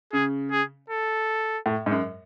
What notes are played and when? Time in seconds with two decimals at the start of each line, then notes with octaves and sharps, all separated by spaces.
0.13 C#3 G#4
0.51 G#4
0.90 A4
1.66 A2
1.86 G#2
1.91 F#2